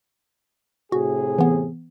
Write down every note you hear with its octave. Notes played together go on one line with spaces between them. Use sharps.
A2 C3 F#4 G#4
E3 B3